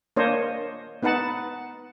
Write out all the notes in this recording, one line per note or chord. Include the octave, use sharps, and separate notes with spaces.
A#3 D4 C5 C#5 D#5
B3 D#4 B4 F#5 A5